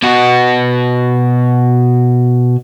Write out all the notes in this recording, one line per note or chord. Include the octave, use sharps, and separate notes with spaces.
B2 F#4